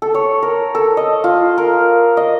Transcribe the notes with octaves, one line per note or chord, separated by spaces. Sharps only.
A4
C#5
A#4
A4
D#5
F4
A#4
D#5